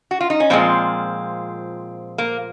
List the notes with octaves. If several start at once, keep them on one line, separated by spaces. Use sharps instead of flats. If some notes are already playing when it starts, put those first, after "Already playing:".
F#4
F4
D#4
C#4
A#2 F3 G#3 C4
A#3